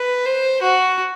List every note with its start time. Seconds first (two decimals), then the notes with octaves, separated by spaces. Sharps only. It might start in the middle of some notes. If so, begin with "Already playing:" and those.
Already playing: B4
0.26 C5
0.62 F#4